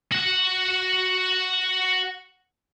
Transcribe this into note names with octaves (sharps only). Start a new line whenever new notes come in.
F#4 F#5